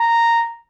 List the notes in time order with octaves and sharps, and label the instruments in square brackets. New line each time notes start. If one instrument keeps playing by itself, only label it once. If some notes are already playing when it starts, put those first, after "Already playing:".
Already playing: [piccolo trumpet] A#5